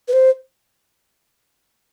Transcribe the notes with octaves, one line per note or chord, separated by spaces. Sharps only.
B4
C5